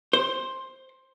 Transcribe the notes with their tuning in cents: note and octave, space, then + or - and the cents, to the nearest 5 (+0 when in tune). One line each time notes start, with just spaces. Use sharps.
C5 +10